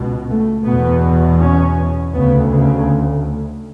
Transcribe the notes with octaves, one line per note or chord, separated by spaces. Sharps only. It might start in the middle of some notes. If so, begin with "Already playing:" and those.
Already playing: C#2 B2
A3
E2 B2 B3
C#4
D2 C#3 B3
C#3